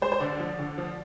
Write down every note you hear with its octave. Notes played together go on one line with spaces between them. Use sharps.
G#3 C5
C5
D3 D5
F3
D3
F3